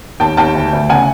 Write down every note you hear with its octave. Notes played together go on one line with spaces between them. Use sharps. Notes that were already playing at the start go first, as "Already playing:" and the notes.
D#2 G5 A5
D#2 G5 A5
D2
D2
C#3 F#5 G#5